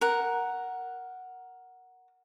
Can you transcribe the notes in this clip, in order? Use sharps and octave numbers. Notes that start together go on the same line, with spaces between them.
A#4 F#5